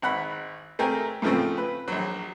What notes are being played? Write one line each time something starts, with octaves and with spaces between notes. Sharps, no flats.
G#1 F#5 B5
A3 C4 G4 G#4 A#4
A2 C#3 F3 A3 C4
B4
A#1 F#3